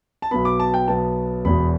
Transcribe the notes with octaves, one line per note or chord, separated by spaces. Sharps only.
A5
B1 B2 B3 B5
D6
A5
G5
B1 B2 B3 A5
E1 E2 B2 B5